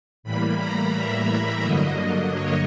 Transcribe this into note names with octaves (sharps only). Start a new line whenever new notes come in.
A2 E3 G3 A#3 B5
A#5
E5
G2 D3 F#3 A#3 D#5
C#5